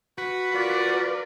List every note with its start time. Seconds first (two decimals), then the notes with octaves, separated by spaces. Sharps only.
0.18 F#4 B4
0.51 F4 A#4 D5